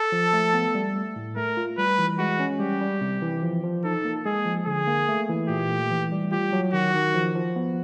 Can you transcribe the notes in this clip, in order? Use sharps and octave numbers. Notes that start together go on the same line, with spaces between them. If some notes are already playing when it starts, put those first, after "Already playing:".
Already playing: A4
F3
A3
B3
G3
A3
A2
A3 A#4
F4
G3 B4
E3
G#3 F#4
C#4
G3 G4
G3
C3
E3
F3
F3
D#4 A4
A#3
G#3 G#4
F3
D3 G#4
A#3
A3
E3
A#2 G4
A3
E3
G3
F4 G4
F#3
D#3 F#4
D#3
F3
F3
B3